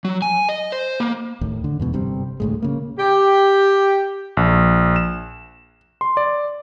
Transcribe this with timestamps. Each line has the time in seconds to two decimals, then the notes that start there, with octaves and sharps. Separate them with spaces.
0.05 F#3
0.22 G#5
0.49 D#5
0.72 C5
1.00 A#3
1.41 D#2 A2
1.64 D3
1.80 E2 G#2 B2
1.93 G1 C3 G3 C4
2.40 D2 A2 G#3
2.62 C#3 A#3
2.98 G4
4.37 A#1
4.96 E7
6.01 C6
6.17 D5